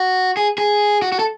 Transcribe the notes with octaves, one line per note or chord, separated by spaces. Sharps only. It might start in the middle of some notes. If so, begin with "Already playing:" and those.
Already playing: F#4
G#4
G#4
F#4
F#4
A4